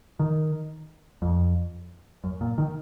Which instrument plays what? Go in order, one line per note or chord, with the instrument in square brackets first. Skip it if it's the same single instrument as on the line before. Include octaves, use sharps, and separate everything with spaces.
[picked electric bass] D#3
F2
F#2
A#2
D#3